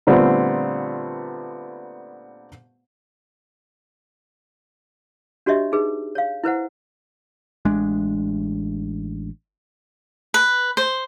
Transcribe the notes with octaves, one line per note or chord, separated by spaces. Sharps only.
A#2 D3 G3 A3 B3 C4
D4 F#4 G4 C#5 D#5 E5
D#4 G#4 B4
C#5 F5
E4 B4 C5 F#5
A1 G#3 D4
B4
C5